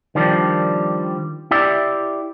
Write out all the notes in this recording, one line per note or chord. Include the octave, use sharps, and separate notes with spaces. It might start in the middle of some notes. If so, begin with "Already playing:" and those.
D#3 F3 G3 D4
E4 G4 D5 E5